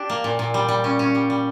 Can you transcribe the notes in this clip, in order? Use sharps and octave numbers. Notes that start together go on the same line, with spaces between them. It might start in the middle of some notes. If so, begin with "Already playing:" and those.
Already playing: D4 G4
A#3
A#2
A#2
G3
G3
C#4
C#4
G3
G3